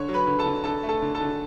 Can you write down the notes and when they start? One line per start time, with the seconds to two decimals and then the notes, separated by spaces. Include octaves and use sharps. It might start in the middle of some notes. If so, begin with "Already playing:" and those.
Already playing: D3 C#5 C#6
0.09 F#3
0.14 B4 B5
0.27 D3
0.39 A4 A5
0.46 D3
0.64 D3 A4 A5
0.83 A3
0.89 A4 A5
1.02 D3
1.15 A4 A5
1.21 D3